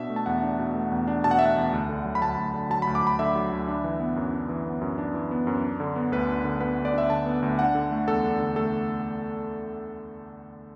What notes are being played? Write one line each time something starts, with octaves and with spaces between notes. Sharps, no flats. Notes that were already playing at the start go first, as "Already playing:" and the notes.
Already playing: B2 D4 E5
A3
A5
E2 F#5
D4
B2
A3
E2
D4
B2 A5
F#5
A3 E5
F#5
E2
D2
D3
F#3
B5
D2 A5
D2
D3
F#3 A5
B5
D2
D6
D2 B5
D3 E5
F#3
D2
D4
E3
B3
F#2
D4
E3
B3
F#2
D4
E3
B3
F#2
D4
D3
B3
D2 B4
D4
D3
B3 B4
D2
D5
D4 E5
D3 A5
B3
D2
D4 F#5
D3
A3
E2 A4
D4
D3
A3 A4